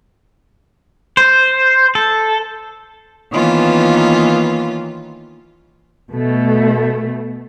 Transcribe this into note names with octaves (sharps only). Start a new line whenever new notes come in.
C5
A4
D#3 E3 A#3 B3 C#4 F4
B2 A3